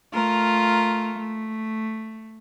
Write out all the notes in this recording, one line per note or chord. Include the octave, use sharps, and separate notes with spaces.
A3 F4 A#4
A3